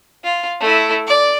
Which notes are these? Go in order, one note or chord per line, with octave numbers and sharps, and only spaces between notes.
F4
A3 E4
D5